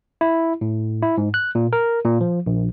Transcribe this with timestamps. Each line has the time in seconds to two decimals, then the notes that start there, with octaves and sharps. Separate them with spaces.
0.21 E4
0.61 A2
1.02 E4
1.18 G#2
1.34 F#6
1.55 A#2
1.73 A#4
2.05 A#2
2.21 F3
2.46 A#1